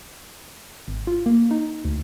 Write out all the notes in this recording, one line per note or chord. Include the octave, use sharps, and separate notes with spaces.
G#1
F4
A#3
D#4
D2